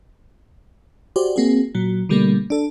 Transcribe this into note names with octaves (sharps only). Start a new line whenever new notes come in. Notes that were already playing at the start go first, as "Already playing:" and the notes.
F#4 G4 C5 D5
A#3 C4 F#4 G#4
A#2 F#3
B2 D3 G3 A3 A#3
D4 A4